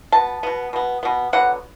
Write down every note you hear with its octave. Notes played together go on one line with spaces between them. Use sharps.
B2 B3 A5
B2 B3
B2 B3
B2 B3
D3 F#3 B3 F#5